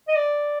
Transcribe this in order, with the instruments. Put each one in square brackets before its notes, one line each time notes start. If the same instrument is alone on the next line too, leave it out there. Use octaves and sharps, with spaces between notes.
[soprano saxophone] D#5
D5